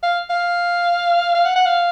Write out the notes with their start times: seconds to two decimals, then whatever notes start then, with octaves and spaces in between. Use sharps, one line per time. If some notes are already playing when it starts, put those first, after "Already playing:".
0.03 F5
0.30 F5
1.35 F5
1.45 F#5
1.56 F#5
1.66 F5